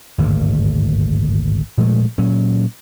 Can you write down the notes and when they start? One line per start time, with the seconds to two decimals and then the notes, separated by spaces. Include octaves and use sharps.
0.18 G#1 D2 G2 A#2
1.78 A#2 F3 G#3 A3
2.18 A#2 F#3 C#4